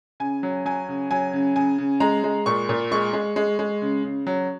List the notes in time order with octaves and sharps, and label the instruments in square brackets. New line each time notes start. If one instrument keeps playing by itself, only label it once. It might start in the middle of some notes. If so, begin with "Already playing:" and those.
[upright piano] C#3 G#5
F#3
F#3 G#5
C#3
F#3 G#5
C#3
C#3 G#5
C#3
G#3 A#5
G#3
A#2 C#6
A#2
G#3 C#6
G#3
G#3
G#3
C#3
C#3
F#3